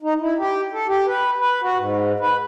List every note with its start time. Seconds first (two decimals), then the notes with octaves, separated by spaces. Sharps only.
0.02 D#4
0.20 E4
0.38 G4
0.73 A4
0.87 G4
1.06 B4
1.38 B4
1.62 F#4
1.78 G#2
2.20 B4